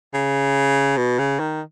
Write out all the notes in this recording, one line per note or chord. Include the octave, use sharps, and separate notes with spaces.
C#3
B2
C#3
D#3